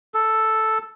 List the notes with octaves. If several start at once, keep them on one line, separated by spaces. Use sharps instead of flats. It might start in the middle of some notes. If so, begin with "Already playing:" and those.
A4